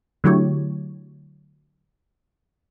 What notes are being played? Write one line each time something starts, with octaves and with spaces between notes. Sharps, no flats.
D3 F#3 A3 E4 G4 C#5